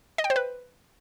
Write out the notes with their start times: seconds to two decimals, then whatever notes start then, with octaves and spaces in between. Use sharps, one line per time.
0.18 D#5
0.24 G5
0.30 C5
0.36 B4